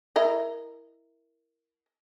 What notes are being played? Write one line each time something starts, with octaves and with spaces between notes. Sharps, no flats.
E4 A#4 D#5